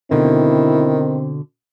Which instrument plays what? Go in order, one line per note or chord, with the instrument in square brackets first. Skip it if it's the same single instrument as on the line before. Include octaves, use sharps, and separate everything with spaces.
[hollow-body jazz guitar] B2 D3 [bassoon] D#3 [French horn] C4 [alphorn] E4